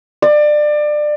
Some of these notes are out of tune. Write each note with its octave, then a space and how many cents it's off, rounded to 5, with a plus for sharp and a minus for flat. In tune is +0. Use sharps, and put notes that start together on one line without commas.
D5 +25